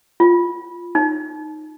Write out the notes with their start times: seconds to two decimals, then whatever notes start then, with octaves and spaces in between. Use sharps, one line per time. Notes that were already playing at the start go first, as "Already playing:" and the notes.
0.20 F4
0.95 D#4